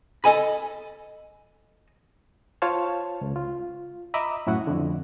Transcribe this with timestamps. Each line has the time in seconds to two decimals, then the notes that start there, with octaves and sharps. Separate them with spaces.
0.24 A4 D#5 G#5 B5
2.62 F4 C5 C#5 F5 A5
3.21 C#2
3.36 F4
4.14 D#5 E5 A#5 B5 D6 D#6
4.47 F#2 A2 E4 F#4 F#5
4.67 F2 D3